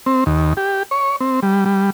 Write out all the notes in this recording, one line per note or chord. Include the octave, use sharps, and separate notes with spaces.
C4
D#2
G4
C#5
C4
G3
G3